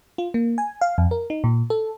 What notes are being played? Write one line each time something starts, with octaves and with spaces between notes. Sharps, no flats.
F4
A#3
G#5
F5
F2
A#4
D#4
A#2
A4